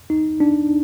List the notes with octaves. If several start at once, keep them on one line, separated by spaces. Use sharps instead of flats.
D#4
D4